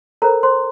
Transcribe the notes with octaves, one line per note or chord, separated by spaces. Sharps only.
F4 A4 A#4 C5 A#5
C5 C6